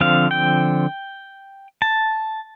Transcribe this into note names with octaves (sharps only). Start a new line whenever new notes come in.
D3 F3 C4 F5
G5
A5